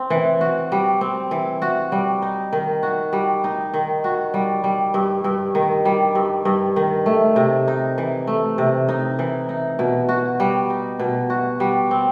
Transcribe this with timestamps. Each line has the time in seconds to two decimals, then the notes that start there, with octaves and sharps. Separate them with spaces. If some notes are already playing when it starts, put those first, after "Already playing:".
Already playing: C4
0.10 E3
0.41 F#4
0.72 G3
1.01 C4
1.31 E3
1.62 F#4
1.92 G3
2.22 D#4
2.53 D#3
2.83 F#4
3.13 G3
3.44 D#4
3.74 D#3
4.04 F#4
4.34 G3
4.64 G3
4.94 G2
5.24 G2
5.55 D#3
5.85 G3
6.15 G2
6.45 G2
6.76 D#3
7.06 A3
7.36 C3
7.68 D#4
7.98 E3
8.27 A3
8.58 C3
8.89 D#4
9.19 E3
9.49 D#4
9.79 B2
10.09 F#4
10.40 G3
10.70 D#4
11.00 B2
11.30 F#4
11.60 G3
11.91 C4